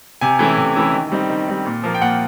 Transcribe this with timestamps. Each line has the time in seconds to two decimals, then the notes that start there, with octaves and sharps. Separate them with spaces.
0.21 C3 G#5
0.39 E3 A3 C#4 E4
0.58 C3
0.76 E3 A3 C#4 E4
0.93 D#3
1.12 G3 C4 D#4
1.30 D#3
1.47 G3 C4 D#4
1.66 A#2
1.83 F3 A#3
1.94 G5
2.01 A#2 F#5